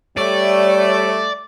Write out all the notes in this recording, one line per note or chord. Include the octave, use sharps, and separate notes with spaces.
G3 A3 C#5 D5